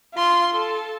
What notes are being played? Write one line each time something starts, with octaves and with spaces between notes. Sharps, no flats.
F4 C6
A4